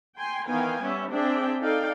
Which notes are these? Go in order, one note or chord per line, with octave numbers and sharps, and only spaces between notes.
G5 G#5 C6
D#3 E3 B3 F5 G5 G#5
G3 B3 C#4 E5
C4 D4 G#4 D5 E5 G5
D#4 A4 D5 F5 G5